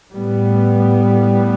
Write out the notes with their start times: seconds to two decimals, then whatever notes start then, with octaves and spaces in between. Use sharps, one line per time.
0.12 A2 G3 B3